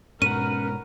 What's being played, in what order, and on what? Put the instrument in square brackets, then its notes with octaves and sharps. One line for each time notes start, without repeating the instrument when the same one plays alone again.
[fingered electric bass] G#2 B2 [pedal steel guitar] C#4 B4 F#5 [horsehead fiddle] A#4 [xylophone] D#7